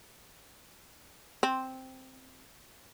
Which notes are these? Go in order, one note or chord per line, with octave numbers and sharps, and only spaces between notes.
C4